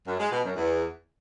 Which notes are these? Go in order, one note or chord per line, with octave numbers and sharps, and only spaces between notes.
F#2
G#3
B2
F#2
E2